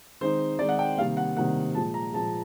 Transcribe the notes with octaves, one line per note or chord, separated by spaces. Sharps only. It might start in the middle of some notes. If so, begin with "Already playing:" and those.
D#3 G#3 C4 D#4 C5
D#3 G#3 C4 D#4 D5
F#5
G5
C3 D#3 G3 A#3 F5
F#5
C3 D#3 G3 A#3 F#5
A#2 F3 G#3 A5
A#5
A#2 F3 G#3 A5